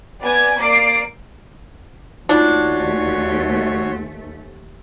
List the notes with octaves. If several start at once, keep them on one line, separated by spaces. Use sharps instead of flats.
B3 D5 G#5 G#6
A#3 D5 D6 C7 D7
D#2 A3 D4 D#4 F4 F#4 C#5 C6